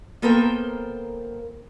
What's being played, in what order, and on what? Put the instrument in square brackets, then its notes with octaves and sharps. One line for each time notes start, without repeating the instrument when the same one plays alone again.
[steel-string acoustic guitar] A#3 B3 A4 A#4 C5 G5